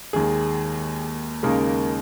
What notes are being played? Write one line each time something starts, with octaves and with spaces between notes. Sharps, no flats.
D#2 D#3 G#3 G#4
D#2 C#3 G#3 A#3 D#4 A#4